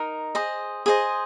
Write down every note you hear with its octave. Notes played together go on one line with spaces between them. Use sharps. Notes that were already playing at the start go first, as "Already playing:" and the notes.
Already playing: D#4 A#4
G#4 C5 D#5
G#4 C5 D#5